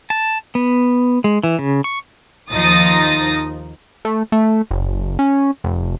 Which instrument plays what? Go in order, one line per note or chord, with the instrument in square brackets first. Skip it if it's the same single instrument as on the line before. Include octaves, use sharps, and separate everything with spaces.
[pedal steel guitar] A5
B3
G#3
E3
C#3
C#6
[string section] D#2 F3 D#4 D#6 A6 A#6
[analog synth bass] A3
A3
F#1
C#4
F1